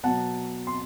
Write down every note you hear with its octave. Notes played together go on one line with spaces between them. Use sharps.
B2 F#3 B3 F#5 A5
C6